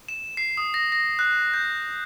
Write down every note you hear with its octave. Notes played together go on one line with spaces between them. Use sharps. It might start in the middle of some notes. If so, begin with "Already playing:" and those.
E7
C7
D#6
A#6
A#6
F#6
G6